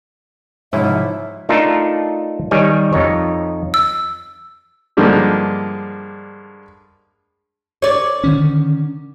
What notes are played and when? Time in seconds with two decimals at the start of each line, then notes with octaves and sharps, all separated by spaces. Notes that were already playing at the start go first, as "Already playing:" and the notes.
0.73 G#2 C3 F3 C#4 E4 E5
1.49 A3 D4 D#4 F4 A4 A#4
2.51 D#3 G3 C#5 D#5 G#5
2.93 F2 D#4 C#5
3.74 E6
4.97 G2 D3 F3 G#3 A#3 D4
7.82 C#5 D5
8.24 D3 D#3 C#4